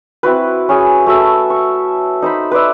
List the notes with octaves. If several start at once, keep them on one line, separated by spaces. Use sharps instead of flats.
C4 E4 F#4 B4
C#4 G#4
A3 F#4 E5 A5
C#6
D#4 C5 B5
B4 C5 D5 E5